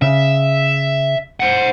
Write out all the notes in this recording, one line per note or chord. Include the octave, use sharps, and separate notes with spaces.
C#3 E5
C5 F#5